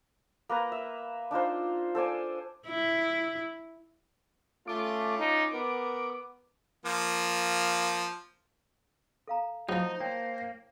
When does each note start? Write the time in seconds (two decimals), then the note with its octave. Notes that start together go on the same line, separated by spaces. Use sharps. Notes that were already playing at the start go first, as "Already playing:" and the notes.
0.49 A#3 B4 A#5
0.72 E5
1.31 D4 D#4 F4 C5
1.95 A4 C5 D5 G#5
2.68 E4
4.68 A3 C#4 F4 D6
5.19 D#4
5.54 B3 A#4
6.86 F3 A#3
9.27 A4 F5 A#5
9.69 F3 F#3 D#4 E4 C5 B5
10.00 A#3 C#5 G5 A5